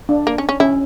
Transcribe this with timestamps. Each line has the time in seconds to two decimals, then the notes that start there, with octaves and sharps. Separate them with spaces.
0.09 D4
0.27 A#3
0.38 C#4
0.49 C#4
0.60 C#4 E4